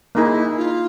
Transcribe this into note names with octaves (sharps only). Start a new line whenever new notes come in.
A#3 D#4 E4 G#4
F4